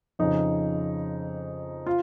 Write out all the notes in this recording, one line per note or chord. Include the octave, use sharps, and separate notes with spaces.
F2 C#3 D#4
F4